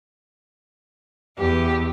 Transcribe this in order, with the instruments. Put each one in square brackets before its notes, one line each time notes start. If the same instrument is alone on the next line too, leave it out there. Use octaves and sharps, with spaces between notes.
[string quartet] E2 [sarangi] G4